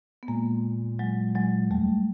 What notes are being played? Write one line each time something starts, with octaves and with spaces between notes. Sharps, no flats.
B3
A#2 G#3 A#3
F#3 G#3
F#3 G#3
E2 G3 A3
E2